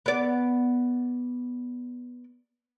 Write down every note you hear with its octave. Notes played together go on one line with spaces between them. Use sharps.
B3 D5